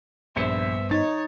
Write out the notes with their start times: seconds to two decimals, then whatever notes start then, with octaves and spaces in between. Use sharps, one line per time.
0.36 A#1 G2 B3 C5 E5 C#7
0.91 D#4 C#5 A6